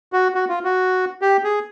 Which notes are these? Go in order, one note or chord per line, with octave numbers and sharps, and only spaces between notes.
F#4
F#4
F4
F#4
G4
G#4